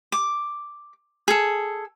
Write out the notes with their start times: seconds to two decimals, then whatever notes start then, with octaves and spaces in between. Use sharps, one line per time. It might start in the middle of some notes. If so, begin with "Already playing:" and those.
0.12 D6
1.28 G#4 A4